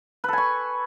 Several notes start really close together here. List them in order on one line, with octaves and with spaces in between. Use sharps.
B4 A4 G#5 C#6